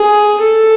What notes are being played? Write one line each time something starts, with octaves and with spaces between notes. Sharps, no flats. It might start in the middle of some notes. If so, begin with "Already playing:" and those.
Already playing: G#4
A4